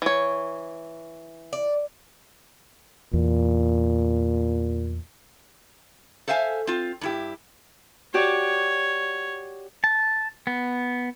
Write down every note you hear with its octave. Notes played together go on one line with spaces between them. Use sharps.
E3 C#5
D5
E2 A#2
A4 C5 E5 F5 G#5
C4 F4
G2 E4 G4
F#4 G4 C#5 D5
A5
B3